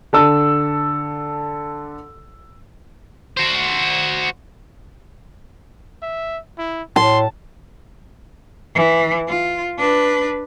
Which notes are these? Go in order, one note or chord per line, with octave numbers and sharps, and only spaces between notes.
D3 A4 E6
F#4 C5
E5
E4
A2 A5 C6
E3
F4
D4 B4